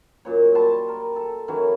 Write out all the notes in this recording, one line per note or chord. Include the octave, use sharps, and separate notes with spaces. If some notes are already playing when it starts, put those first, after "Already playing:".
F#2 A#2 C#5
G3 A5 C6
A#4
A4
D#3 E3 F#3 C#4